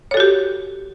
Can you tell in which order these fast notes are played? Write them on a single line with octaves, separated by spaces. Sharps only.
C#5 A4 F#4 G4